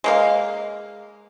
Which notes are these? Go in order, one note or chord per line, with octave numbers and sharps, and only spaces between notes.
G#3 A#3 F5